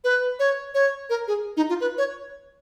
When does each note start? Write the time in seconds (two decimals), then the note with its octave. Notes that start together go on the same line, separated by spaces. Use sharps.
0.04 B4
0.39 C#5
0.74 C#5
1.10 A#4
1.28 G#4
1.57 D#4
1.69 F4
1.81 B4
1.98 C#5